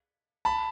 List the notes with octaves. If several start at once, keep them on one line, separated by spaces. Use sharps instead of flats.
A5 B5